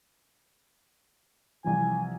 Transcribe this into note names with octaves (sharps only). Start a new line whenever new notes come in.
C2 E3 F3 G#5